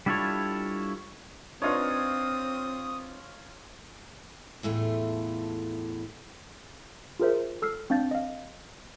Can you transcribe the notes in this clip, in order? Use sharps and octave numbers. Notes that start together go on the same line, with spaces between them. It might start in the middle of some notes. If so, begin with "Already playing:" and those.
G3 D4 E4 F4 A4 C#5
C4 D4 D#4 F4 B4 C#5 D#6
E2 A2 A3 F4
F4 G#4 A#4 C5 E5
A4 E6 F6 C7
C4 D4 F5 G6 A6
D#5 F5